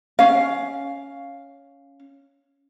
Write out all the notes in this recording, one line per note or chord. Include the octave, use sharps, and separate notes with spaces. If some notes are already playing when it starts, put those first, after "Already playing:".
C#4 F5